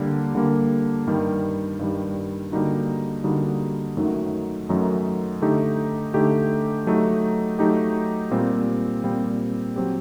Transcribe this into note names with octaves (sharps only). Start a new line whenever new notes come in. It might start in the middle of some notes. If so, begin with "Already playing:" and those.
Already playing: D3 G3 A#3
D3 G3 A#3
G2 D#3 G3
G2 D#3 G3
D3 G3 A#3 D#4 F#4
D3 G3 A#3 D#4 F#4
F#2 D#3 F#3 A3 D#4
F#2 D#3 F#3 A3 D#4
D3 A3 D#4 G4
D3 A3 D#4 G4
F#3 A3 D#4 G4
F#3 A3 D#4 G4
A#2 G3 C4
A#2 G3 C4
F#3 C4 G4